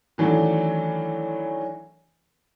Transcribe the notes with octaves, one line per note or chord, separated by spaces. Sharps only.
D#3 E3 F#3 A3 C#4 D4